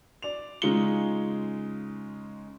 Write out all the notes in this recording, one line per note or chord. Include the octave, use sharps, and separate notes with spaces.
D5 F7
C#3 G#3 D#4 F4 C#7 G7